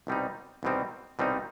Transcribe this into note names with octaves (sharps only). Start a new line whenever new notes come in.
C2 B2 G3 C4 D#4
C2 B2 G3 C4 D#4
C2 B2 G3 C4 D#4